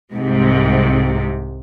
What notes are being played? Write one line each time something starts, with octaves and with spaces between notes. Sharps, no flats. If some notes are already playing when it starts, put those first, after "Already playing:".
C2 G#2 C3